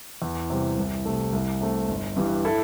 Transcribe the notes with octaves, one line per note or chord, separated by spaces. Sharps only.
E2
C3 G3
C2
C3 A3
C2
C3 A3
G1
G2 E3 G3
E4 A4